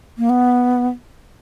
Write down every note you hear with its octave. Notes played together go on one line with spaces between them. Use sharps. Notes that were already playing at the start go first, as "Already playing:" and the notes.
A#3
B3